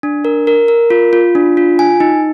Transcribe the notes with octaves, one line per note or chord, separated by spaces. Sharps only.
D4
A#4
A#4
A#4
F4
F4
D4
F4
G#5
D#4